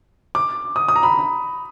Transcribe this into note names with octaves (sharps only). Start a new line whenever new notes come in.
D6
D#6
D#6
A#5
B5